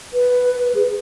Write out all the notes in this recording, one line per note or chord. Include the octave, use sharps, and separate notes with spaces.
B4
G#4